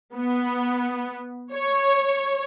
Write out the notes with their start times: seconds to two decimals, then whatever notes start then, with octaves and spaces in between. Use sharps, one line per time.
0.14 B3
1.53 C#5